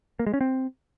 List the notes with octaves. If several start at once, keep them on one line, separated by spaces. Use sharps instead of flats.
A#3
G#3
C#4
C4